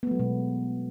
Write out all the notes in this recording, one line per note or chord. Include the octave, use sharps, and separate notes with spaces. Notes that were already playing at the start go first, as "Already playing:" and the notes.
B2 F#3 G#3 A3 B3